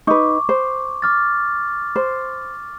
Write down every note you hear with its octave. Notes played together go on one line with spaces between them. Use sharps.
D#4 B4 C#6 D6
C5
D6 F6 A6
C5